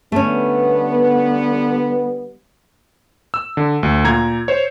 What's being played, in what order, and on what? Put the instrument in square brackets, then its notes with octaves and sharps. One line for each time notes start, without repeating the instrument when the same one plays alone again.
[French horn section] D3 G3 B3 [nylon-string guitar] A3 C#4
[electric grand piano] E6
D3
D2
A#2 A#5 G#6
C5 C#5